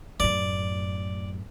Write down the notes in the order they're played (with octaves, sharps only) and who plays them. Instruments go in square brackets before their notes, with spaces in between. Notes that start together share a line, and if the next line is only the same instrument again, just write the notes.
[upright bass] F#2 A2 [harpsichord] D5